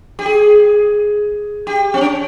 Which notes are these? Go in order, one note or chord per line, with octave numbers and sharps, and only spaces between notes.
G4
G#4
G4
C4
C#4